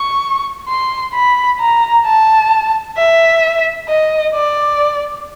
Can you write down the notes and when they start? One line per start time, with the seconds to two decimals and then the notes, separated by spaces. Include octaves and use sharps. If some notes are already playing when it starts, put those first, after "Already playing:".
Already playing: C#6
0.68 C6
1.14 B5
1.60 A#5
2.06 A5
2.97 E5
3.89 D#5
4.34 D5